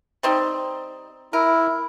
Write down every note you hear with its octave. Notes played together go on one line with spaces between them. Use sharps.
G3 C4 D#4
E4 A#4